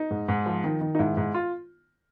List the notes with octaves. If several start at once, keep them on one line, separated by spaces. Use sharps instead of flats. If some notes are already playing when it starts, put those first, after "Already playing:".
Already playing: D#4
G#2
G#2
F3
D#3
D#3
D#4
G#2 E4
G#2
F4